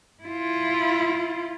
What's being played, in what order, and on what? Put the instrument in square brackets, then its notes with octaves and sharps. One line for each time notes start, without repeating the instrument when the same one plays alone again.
[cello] E4 F4